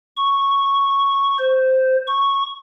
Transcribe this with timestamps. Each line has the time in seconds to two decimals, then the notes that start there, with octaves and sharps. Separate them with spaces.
0.17 C#6
1.38 C5
2.07 C#6